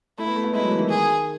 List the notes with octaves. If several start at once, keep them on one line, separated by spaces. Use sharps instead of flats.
A3 E4
B3
A3
B3
G#3 E4
F#3
E3
D#3
G#4